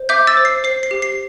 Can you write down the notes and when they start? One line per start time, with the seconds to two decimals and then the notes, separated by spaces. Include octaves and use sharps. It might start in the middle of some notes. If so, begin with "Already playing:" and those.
Already playing: C5
0.09 E5 D6 G6
0.27 E6 A6
0.37 C5
0.45 C7
0.64 C5 C7
0.83 C7
0.91 G4
1.02 C7